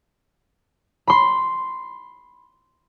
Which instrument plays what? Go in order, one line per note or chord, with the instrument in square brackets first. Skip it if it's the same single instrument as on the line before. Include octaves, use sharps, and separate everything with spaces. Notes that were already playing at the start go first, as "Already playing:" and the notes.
[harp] B5 C6